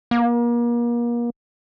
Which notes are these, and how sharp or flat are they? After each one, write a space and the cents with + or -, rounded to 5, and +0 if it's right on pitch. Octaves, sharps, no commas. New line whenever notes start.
A#3 +35